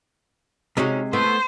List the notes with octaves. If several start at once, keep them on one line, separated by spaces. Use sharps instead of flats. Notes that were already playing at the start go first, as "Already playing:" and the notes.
C3 G#3 C#4 D#4 F#4
A3 B3 E4 C5